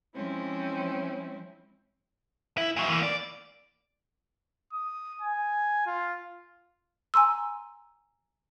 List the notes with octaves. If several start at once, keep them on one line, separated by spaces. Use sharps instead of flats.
F3 G#3 C4 C#4 E4
E4
A#2 F#3
E3 A#3
D5
D#6
G#5
F4
G#5 A#5 C6 E6